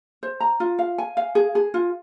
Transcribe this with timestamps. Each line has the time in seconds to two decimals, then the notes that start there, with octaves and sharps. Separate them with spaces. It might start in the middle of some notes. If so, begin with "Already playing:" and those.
0.23 C5
0.40 A#5
0.60 F4
0.79 F5
0.98 G#5
1.17 F5
1.35 G#4
1.55 G#4
1.74 F4